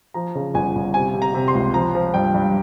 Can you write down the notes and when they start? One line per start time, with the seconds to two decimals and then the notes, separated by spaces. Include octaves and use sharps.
0.14 F3 A#5
0.35 C#3
0.54 G1 G#5
0.75 G1
0.94 C3 G#5
1.14 C3
1.22 A#5
1.34 C3
1.48 C6
1.54 C#2
1.74 F3 A#5
1.95 F3
2.14 G2 G5
2.34 G2